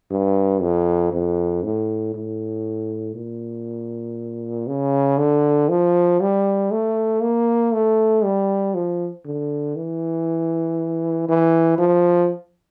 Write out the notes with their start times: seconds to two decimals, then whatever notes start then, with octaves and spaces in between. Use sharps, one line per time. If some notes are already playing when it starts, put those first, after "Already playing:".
0.11 G2
0.62 F2
1.12 F2
1.64 A2
2.14 A2
3.15 A#2
4.67 C#3
5.18 D3
5.69 F3
6.21 G3
6.71 A3
7.22 A#3
7.73 A3
8.24 G3
8.74 F3
9.25 D3
9.76 E3
11.28 E3
11.78 F3